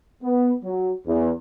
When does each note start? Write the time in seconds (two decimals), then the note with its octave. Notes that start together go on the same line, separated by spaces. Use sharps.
0.23 B3
0.64 F#3
1.07 E2